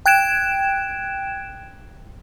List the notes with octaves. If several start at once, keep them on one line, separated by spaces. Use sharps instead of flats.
G5 F#6 G#6 D7 E7